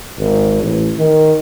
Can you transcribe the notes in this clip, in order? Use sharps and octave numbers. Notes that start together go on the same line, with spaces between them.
G#1
A1
D#3